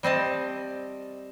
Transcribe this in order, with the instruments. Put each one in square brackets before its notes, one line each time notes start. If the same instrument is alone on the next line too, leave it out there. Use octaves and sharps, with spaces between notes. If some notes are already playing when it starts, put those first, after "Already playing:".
[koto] G3 C4 D#5 A5